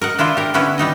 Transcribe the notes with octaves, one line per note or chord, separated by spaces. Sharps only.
A#4 D#5 F#5
D4 E4 F4 C5
G4 A#4
D3 B3 C#4 E4 B4
G3 B3 D#4 D#5